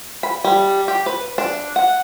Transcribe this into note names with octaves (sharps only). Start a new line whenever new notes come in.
B5
G3
G4
B4
D4
F#5